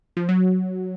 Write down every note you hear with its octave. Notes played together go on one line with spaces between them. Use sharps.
F3
F#3